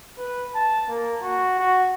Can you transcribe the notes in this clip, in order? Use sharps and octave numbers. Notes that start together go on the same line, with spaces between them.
B4
A5
A#3
F#4
F#4